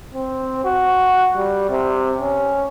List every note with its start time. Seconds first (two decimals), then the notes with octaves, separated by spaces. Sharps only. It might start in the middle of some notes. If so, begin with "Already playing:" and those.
0.14 C4
0.65 F#4
1.35 G3
1.70 C3
2.20 C#4